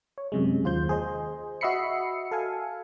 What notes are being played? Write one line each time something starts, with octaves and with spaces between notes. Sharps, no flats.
C#5
F#2 C3 G#3
D#2 F4 C5 G6
G#4 C5 D#5
F#4 D#5 E5 B5 C7 C#7
A4 F5 G#5